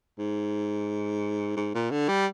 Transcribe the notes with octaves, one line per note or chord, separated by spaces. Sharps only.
G#2
G#2
A#2
D3
G3